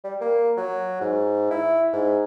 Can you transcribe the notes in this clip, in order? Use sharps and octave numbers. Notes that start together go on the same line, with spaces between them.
G3
A#3
F#3
G#2
E4
G#2